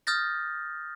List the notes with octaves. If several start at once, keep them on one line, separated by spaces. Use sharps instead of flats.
D#6 F6 G6 A6 A#6